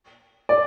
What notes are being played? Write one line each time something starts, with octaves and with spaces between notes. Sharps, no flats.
D5